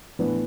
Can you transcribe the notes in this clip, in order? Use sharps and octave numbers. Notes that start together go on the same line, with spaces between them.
A2 E3 B3 D4 B4